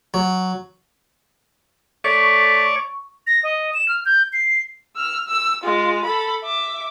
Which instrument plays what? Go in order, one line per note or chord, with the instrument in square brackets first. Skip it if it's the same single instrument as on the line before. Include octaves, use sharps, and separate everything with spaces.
[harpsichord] F#3
[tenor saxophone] A3 [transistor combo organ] C#5 D5 [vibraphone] C#6
[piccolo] A#6
D#5
E7
F6
G6
C7
[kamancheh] E6 F6
E6
G#3 F4
A4 B5
E5 D6